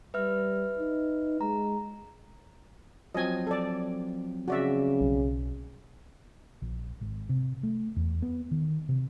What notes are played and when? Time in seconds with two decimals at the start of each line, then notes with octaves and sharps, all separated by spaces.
0.14 G3 B4 E5 F6
0.79 D#4
1.41 G#3 A#5
3.14 F3 F#3 C4 D#5 G#5
3.47 A4 D5
4.48 C#3 F#4 D5 E5
5.01 B1
6.62 A#1
7.01 G#1
7.29 C3
7.63 A3
7.96 E2
8.22 B3
8.51 D#3
8.89 C3